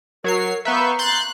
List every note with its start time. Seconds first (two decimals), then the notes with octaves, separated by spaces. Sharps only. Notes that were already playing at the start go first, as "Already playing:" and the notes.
0.24 F#3 A#4 C#5 C7
0.65 B3 B4 E5 F5 A#5 C#6 G6
0.99 C6 F#6 G6 A6